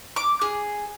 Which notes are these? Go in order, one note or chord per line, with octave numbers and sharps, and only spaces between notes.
D6
G#4